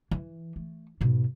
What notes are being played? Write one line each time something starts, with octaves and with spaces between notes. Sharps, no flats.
E3
A3
G#2 B2